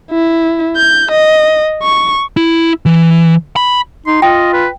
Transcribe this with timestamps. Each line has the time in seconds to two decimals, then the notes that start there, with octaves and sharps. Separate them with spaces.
0.11 E4
0.76 G6
1.11 D#5
1.83 C#6
2.37 E4
2.86 E3
3.56 B5
4.07 D#4 C6
4.22 F4 D#5 G5
4.53 B4